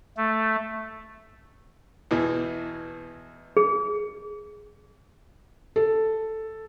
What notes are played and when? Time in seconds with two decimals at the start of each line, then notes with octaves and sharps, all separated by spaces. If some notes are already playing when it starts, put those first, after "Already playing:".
0.17 A3
2.11 E2 B2 E3
3.57 G#4
5.76 A4